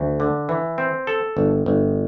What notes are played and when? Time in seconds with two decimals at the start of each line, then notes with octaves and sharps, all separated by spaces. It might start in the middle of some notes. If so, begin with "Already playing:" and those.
Already playing: D2
0.20 D3
0.49 E3
0.78 C4
1.07 A4
1.37 G1
1.66 G1